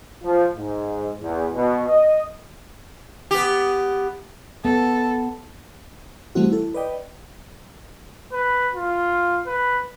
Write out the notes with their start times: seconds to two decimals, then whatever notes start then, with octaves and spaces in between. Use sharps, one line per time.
0.23 F3
0.55 G#2
1.21 E2
1.54 B2
1.89 D#5
3.31 B3 G4
4.65 B3 A4
6.35 E3 G3 A3 C4 E4 F#4
6.52 E4 A4
6.74 B4 D5 D#5 G5
8.33 B4
8.75 F4
9.46 B4